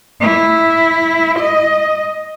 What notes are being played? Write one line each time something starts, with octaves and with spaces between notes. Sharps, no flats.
E4
D#5